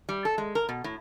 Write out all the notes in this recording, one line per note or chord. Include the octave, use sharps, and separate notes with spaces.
G3
A4
G#3
A#4
B2
A2